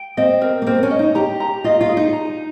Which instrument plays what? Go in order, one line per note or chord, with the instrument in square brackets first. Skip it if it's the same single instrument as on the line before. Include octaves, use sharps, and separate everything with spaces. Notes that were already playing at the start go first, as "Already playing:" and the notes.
Already playing: [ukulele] G5
[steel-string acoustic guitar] C4 [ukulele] D#5
[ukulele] A#4
[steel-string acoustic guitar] A#3
[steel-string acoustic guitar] C4 [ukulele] A#4
[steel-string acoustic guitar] C#4
[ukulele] D#5
[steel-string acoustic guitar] D#4
[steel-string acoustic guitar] G4 [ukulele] A#5
[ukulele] A#5
[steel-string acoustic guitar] F4 [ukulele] D#5
[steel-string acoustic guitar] F4
[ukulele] G#4
[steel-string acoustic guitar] D#4
[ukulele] A#5